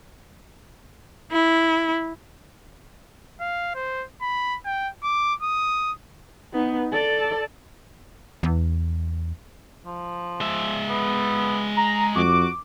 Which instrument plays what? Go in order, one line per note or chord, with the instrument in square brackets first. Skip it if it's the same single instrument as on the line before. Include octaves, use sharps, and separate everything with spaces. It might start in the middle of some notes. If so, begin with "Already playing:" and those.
[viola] E4
[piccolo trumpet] F5
C5
B5
G5
D6
D#6
[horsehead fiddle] B3 D#4
A4 D5
[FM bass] E2
[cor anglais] F3
[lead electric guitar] G#3 E5
[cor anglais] B3
[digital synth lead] A#5
[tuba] F2 [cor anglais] F#4 [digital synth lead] D6